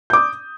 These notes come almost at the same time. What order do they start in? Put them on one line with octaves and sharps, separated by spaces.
G6 D6 D#6